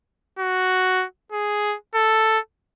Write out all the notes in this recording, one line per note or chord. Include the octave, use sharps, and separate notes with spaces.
F#4
G#4
A4